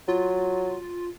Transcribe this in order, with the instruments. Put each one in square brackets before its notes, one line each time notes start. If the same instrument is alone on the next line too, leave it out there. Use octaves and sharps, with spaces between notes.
[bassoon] F#3 [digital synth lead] F4